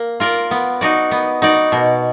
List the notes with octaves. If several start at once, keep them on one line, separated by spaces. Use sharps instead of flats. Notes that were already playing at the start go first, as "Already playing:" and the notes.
Already playing: A#3
F4 A#4 D5
B3
D#4 F#4 D5
B3
D#4 F#4 D5
B2